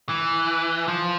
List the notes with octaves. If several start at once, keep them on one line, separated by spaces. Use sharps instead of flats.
E3
F3